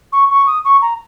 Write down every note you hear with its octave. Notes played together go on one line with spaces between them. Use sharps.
C#6
C#6
D#6
C#6
A#5